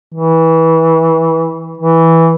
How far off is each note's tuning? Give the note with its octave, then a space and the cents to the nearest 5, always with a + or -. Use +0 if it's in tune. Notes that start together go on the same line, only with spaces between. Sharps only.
E3 -20
E3 -10